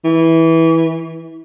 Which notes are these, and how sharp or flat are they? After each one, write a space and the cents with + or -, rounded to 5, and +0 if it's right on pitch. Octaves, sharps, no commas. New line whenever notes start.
E3 -15